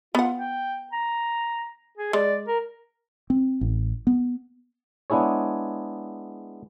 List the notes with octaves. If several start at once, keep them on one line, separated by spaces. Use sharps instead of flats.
B3 F4 F#5
G5
A#5
G#4
G#3 D5
A#4
C4
A1
B3
G#3 B3 D4 E4 G#4 C#5